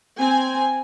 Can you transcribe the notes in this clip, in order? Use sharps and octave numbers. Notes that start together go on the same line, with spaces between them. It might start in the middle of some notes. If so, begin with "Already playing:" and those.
C4 G#5